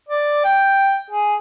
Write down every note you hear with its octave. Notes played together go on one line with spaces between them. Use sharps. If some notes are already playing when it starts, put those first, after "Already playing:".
D5
G5
G#4